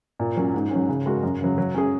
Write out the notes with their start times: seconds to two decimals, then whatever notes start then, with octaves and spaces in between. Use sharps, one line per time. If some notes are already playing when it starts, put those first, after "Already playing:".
0.19 A#2
0.36 F#3 C#4
0.54 G#2
0.71 F#3 C#4
0.89 C#3
1.06 G#3 F#4 A#4
1.23 F#2
1.41 C#3 F#3
1.58 F#3
1.74 C#4 G#4